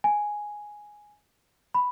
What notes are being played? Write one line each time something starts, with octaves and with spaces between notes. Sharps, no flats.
G#5
B5